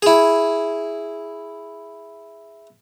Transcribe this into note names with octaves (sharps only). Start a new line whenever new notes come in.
E4 G#4